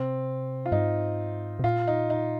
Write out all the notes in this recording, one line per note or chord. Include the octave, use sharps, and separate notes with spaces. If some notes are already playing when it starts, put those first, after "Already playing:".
Already playing: C3 C4
F4
G#2 D#4
C3
A#2 F4
D#4
D#4